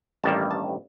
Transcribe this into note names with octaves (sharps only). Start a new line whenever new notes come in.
A1 G2 D#3 G3 A#3 A5
A5